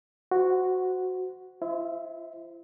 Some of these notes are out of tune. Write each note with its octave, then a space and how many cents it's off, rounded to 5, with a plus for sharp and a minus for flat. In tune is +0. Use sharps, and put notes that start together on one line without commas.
F#4 +0 C5 -20
E4 +40 C5 +0 E5 -35